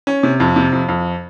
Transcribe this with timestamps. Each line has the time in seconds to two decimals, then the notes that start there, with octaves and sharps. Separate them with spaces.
0.07 C#4
0.23 C3
0.40 F2
0.56 C3
0.73 F2
0.89 F2